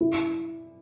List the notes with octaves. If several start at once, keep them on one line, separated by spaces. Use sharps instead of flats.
E4